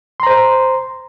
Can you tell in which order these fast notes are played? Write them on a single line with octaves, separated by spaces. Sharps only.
C6 A#5 C5